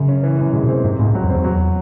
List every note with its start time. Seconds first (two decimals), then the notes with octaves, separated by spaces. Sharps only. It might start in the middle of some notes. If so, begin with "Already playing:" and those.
Already playing: F#2 C#3
0.08 C#4
0.23 E3
0.39 F#2
0.53 C3 G#3
0.64 C3
0.68 C4
0.84 G#2 C3
0.99 C#2 A2
1.15 F#3
1.24 F#2
1.30 C4
1.35 E2
1.44 F#3